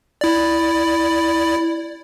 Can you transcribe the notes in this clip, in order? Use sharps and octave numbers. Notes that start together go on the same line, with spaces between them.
E4 D5